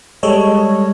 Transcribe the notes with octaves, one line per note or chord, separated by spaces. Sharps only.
G3 G#3 A4 C#5 D#5